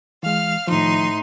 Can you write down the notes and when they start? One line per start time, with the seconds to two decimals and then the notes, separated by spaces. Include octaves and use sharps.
0.23 E3 G#3 F5 F6
0.67 A2 D#3 F3 D#4 C6